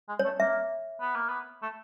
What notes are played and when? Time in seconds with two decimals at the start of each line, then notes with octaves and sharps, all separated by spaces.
0.09 G#3
0.19 C#5
0.25 A3
0.40 A#3 E5
1.01 B3
1.15 A#3
1.29 B3
1.62 A3